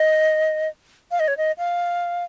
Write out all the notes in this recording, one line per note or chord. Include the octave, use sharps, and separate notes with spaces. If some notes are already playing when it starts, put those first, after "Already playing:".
Already playing: D#5
F5
D#5
C#5
D#5
F5